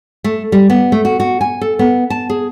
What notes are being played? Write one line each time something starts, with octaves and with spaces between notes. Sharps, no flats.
A3
G3
B3
A3
F#4
F#4
G#5
A4
B3
A5
G#4